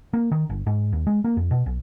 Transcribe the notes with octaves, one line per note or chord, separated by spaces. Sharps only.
A#3
D#3
G1
G#2
D#2
G#3
A#3
F2
B2
B1